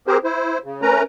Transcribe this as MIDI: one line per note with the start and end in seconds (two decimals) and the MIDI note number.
0.07 0.18 60
0.07 0.18 67
0.07 0.18 68
0.07 0.18 70
0.07 0.18 72
0.24 0.58 64
0.24 0.58 72
0.64 0.82 49
0.82 1.03 57
0.82 1.03 61
0.82 1.03 70
0.82 1.03 71
0.82 1.03 82